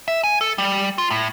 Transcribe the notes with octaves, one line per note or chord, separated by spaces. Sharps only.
E5
G#5
A4
G3
F4
A2